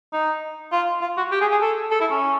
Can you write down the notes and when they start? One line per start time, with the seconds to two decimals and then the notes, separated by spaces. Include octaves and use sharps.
0.13 D#4
0.72 F4
1.02 F4
1.17 F#4
1.31 G4
1.41 G#4
1.51 G#4
1.61 A4
1.91 A4
2.01 E4
2.11 C#4